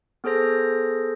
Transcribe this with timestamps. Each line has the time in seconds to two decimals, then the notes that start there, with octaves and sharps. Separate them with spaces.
0.24 B3 G#4 A4 C5 A#6